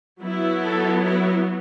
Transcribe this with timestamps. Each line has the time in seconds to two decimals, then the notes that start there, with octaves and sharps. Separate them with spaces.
0.21 F#3 B3 E4
0.63 A4
1.04 E4